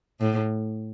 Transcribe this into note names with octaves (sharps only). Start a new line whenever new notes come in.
A2